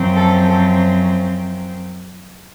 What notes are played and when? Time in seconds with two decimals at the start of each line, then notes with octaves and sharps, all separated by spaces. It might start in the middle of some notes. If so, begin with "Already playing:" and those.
Already playing: F#2 F3 C4
0.15 A4
0.44 A4